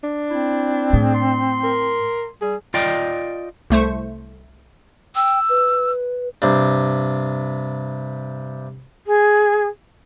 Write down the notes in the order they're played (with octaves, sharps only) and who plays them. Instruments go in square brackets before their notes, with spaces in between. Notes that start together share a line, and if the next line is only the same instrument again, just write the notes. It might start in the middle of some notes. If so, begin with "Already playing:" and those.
[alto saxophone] D4
[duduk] C4 [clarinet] E4
[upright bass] A2 [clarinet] G#4
[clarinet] C6
[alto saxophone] A#4
[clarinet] G3 [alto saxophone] G#4
[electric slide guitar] F4 D5 D#5 G5
[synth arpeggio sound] C2 A3 C5 C#6
[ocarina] G5 [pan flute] E6
[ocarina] B4
[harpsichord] G2 C3
[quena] G#4